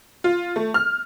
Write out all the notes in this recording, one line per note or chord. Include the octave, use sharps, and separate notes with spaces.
F4
A3
F6